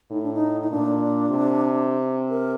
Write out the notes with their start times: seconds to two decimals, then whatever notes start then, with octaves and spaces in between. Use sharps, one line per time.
0.11 A2 D#4
0.22 D4
0.33 D#4
0.61 D#4
0.70 A#2 D4
1.30 C3
2.30 A#4